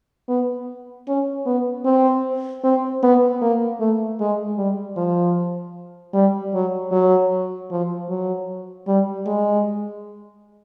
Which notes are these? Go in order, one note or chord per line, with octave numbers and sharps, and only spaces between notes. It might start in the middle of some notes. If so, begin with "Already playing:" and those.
B3
C#4
B3
C4
C4
B3
A#3
A3
G#3
G3
F3
G3
F#3
F#3
F3
F#3
G3
G#3